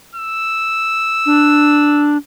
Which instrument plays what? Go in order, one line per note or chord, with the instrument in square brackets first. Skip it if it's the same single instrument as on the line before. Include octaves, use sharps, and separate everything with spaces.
[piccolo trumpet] E6
[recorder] D4